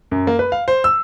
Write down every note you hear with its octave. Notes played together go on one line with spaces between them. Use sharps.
F#2
A#3
B4
F5
C5
E6